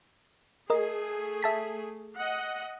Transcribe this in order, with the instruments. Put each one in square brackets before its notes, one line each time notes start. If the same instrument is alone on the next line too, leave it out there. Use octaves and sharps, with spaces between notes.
[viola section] A3 G#4 [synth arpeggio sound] A#4 D#5
[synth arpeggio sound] E5 A5 B6
[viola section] D#5 F#5